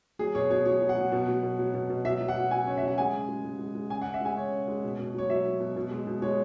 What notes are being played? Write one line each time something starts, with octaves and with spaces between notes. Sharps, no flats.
F#3 G#4
B2 C#5
B2 C#5
F#3 C#5
F#3
F#5
F#3
B2
F#3
B2
F#3
B2
B2
F#3 E5
F#3
F#5
F#3
F#3 G#5
C#3 C#5
F#3 E5
F#5
G#3 G#5
C#3
G#3
G#3
G#3
G#3
C#3 G#5
C#3 F#5
E5
G#3 G#5
C#3 C#5
C#3
G#3
B2
B2
F#3 C#5
F#3 E5
F#3
B2
B2
G#3
B2
G#3 C#5